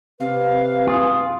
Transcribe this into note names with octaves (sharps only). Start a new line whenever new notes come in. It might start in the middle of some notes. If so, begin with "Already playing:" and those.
C3 B4 F5
F4 G#4